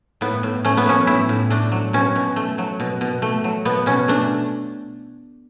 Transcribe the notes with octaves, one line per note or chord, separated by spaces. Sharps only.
A2 B3
A2
A3 C#4
B3
F#3 C#4
A2 E4
A2
A3 D4
F#3
B2 C#4
B2
A3
F#3
B2
B2
A3
F#3
B2 B3
B2 C#4
A3 D4